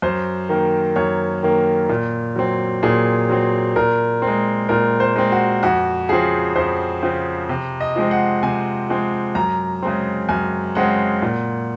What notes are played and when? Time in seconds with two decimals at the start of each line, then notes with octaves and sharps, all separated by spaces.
0.02 F#2 C5
0.49 D#3 A#3
0.96 F#2 C#5
1.43 D#3 A#3
1.89 A#2
2.36 F#3 C4
2.83 A#2 G#4
3.29 F#3 C4
3.76 A#2 A#4
4.22 C4
4.27 G#3
4.69 A#2 A#4
5.00 C5
5.16 G#3 C4
5.32 F#4
5.63 F2 F#4
6.09 C#3 F3 C4 G#4
6.56 F2 C5
7.02 C#3 F3 C4
7.49 C3
7.81 D#5
7.96 F3 G#3 C4
8.11 F#5
8.43 C3 G#5
8.89 F3 G#3 C4
9.35 F#2 A#5
9.82 C#3 G#3 C4
10.29 F#2 G#5
10.75 C#3 G#3 C4 F#5
11.22 A#2